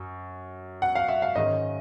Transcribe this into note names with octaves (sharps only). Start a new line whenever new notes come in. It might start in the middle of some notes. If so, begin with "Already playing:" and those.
Already playing: F#2
F#5
F5
E5
F5
G#2 D#3 G#3 C#4 D#5